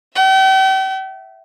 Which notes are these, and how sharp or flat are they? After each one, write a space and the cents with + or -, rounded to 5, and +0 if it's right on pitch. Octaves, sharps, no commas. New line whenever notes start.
E5 +0 G5 -40